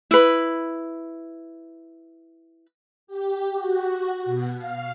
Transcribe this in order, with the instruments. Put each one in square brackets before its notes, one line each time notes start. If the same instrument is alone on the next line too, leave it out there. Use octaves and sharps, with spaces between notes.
[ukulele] E4 B4
[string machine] G4
F#4
B2
F5